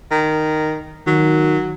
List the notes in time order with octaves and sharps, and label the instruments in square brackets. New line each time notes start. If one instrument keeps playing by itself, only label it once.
[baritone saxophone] D#3
[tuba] D#3 [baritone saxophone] F#3